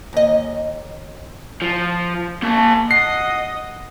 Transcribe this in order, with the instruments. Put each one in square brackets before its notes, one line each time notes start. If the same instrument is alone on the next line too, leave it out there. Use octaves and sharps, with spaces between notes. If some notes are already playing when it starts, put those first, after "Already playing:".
[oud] D#2 D#5
[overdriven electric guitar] F3
A#3 A5
[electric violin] D#5 [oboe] F#5 [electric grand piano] C7